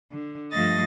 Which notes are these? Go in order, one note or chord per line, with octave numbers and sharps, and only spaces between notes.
D3
G2 F3 A3 D#5 A6 A#6